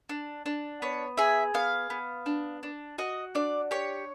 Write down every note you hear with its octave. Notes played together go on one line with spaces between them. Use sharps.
D4
D4
B3 C#5
G#4 E5
B3 F5
B3
D4
D4
F#4 D#5
D4 D5
G4 C#5